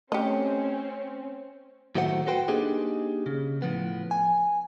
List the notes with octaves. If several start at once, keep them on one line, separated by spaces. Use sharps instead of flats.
A3 C4 C#4 G4 D#5 C#7
A2 D#3 F#3 A3 C5 F#5
F#4 A4 B4 C5 F#5 G5
A#3 D4 D#4 G4 G#4
C#3
A2 F3 B3
G#5